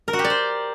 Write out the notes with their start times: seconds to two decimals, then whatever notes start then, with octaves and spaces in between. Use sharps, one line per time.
0.08 A#4
0.13 F#4
0.19 G4
0.24 D5
0.30 C5